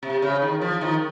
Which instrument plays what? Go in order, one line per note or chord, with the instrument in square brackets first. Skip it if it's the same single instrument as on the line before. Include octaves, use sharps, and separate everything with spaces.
[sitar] C3
C#3
D#3
F3
D#3